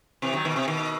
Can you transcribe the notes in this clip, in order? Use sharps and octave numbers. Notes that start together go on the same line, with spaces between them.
C3 E3
D#3 F#3
B2 D#3
C3
B2 D#3